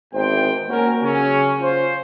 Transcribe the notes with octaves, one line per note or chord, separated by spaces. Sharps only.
G#1 E2 C5 G5
A#3 C#4 F#4 A#4
C#3 F#3 C#4
F4 C5